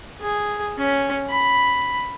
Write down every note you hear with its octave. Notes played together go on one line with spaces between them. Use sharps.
G#4
C#4
B5